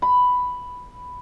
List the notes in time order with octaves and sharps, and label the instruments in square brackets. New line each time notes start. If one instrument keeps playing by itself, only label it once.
[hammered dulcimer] B5